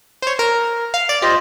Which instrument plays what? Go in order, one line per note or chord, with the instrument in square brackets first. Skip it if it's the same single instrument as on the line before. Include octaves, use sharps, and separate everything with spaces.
[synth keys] C5 C#5
A#4
F5
D5
[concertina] F4 C5 D#5 [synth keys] G4